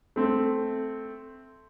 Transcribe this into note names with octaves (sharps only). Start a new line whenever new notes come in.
A3 C4